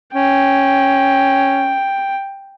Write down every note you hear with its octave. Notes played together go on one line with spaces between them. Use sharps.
C#4 G5